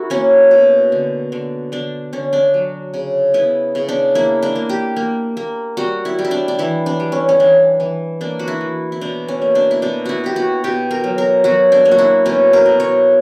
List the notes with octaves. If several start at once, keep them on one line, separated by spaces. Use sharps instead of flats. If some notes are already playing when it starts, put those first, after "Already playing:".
Already playing: E4 F#4 A#4
A#3 C#4
B2
D3
D3
D3 D4
D3 C#4
D4
F#3
C#3
B3 E4
C#3
D4
A#3 E4
D4
A#3
G4
A#3
A#3
G3 F#4
E4
G3
E4
D4
D4
E3 E4
D4
G3
C#4
C#4
E3 D4
E3
A#3 D4
F#4
E4
E3
E4
B2 D4
C#4
A#3
D4
E4
B2 D4
E4 F#4
B2 G4
F#4
B2 G4
A#4
F#3
A#4
F#3 F#4
D4
A#3
F#4
E4
B2 C#4
A#4
B2
C#5